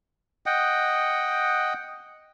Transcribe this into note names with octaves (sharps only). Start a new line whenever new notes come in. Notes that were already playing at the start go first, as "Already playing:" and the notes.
D#5 F#5 G5